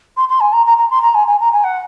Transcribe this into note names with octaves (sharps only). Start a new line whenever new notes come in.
C6
C6
G#5
A#5
A#5
A#5
C6
A#5
G#5
G#5
A#5
G#5
F#5